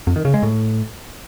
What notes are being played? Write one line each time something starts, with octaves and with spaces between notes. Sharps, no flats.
F2
D#3
C#3
G#3
A2